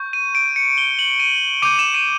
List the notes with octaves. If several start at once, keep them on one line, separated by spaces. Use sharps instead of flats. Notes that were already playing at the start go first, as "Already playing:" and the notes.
Already playing: C#6 G6
D#7
D7
C#7
G7
F#7
D#7
D6 G6 D#7
E7
D#7